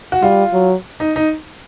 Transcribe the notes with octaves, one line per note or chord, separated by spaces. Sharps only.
F#4
G3 F4
F#3
D#4
D#4